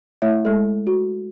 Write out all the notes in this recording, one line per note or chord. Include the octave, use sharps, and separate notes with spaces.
A3 E4 C#5 E5
G#3 A4
F#4